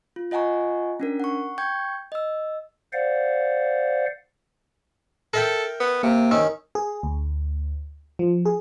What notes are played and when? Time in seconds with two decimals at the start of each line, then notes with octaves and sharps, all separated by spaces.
0.16 F4
0.31 F4 D#5 F#5 G#5 A#5 C#6
1.00 C#4 D4 A#4
1.20 F#5 C#6
1.58 G5 C#6 G6 G#6
2.12 D#5 E6
2.93 C5 D5 F5 F#5
5.33 A4 A#4 E5 G5
5.80 B3
6.03 C3 A#3
6.31 D#3 C#4 E6
6.75 G#4
7.03 D2
8.19 F3
8.45 G#4